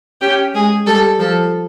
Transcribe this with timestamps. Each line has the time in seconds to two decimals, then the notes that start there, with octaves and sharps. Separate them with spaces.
0.21 C#4 G4
0.54 G#3 G#4
0.86 G3 A4
1.19 F3 A4